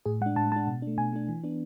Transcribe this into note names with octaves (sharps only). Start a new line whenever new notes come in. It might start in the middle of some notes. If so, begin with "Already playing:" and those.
A2 G#4
G#3 D4 F#5
A2 A5
G#3 D4 A5
B2
A3 D4
B2 G#5
A3 D4
E3
B3 D4